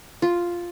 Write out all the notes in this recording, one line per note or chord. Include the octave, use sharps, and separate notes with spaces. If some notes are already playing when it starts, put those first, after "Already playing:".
F4